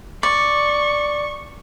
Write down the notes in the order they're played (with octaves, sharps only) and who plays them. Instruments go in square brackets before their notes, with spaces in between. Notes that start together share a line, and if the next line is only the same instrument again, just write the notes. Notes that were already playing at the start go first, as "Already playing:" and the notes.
[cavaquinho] D5 [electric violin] C#6